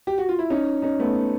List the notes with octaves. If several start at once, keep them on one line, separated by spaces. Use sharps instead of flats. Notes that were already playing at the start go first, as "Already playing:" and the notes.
G4
F#4
F4
E4
C#4 D#4
C#4 D#4
A3 B3